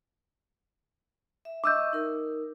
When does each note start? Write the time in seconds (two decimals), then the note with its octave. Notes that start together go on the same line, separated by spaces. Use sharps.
1.45 E5
1.64 D#5 E5 C#6 D6 E6 G6
1.93 D#4 A#4